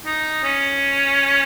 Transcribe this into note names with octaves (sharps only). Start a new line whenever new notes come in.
D#4
C#4